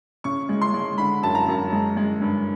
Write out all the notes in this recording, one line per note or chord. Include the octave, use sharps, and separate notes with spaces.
C#3 C#6
G#3
C6
G#3
D3 B5
F#2 A5
A#5
F#2
G#3
G#3
G2